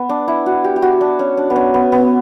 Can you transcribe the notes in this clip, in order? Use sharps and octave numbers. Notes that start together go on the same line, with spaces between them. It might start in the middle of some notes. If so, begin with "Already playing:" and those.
Already playing: B3
D4
E4
F#4
G4
G4
F#4
D4
C#4
D4
B3
C#4
B3
B3